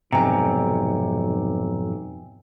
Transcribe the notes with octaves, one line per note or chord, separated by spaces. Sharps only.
B1 F2 G#2 C3 G5 G#5 A#5